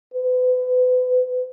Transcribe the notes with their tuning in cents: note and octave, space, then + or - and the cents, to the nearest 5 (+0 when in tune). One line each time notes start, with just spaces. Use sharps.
B4 +35